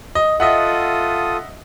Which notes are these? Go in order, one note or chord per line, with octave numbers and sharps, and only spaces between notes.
D#5
F4 A4 D#5 E5 F#5 D#6